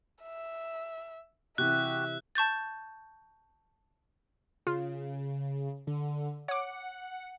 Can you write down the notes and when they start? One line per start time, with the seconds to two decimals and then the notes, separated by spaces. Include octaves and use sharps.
0.23 E5
1.58 C3 E3 F#4 G4 E5 F#6
2.35 A5 C#6 G6 A6
4.67 C#3 F4
5.87 D3
6.48 C#5 F#5 D6